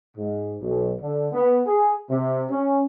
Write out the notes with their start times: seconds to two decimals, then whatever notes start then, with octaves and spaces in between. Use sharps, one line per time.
0.17 G#2
0.61 B1
1.01 D3
1.32 B3
1.67 G#4
2.10 C3
2.51 C#4